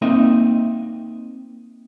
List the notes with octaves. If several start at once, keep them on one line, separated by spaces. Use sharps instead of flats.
A#3 C4 D#4 D#5 E5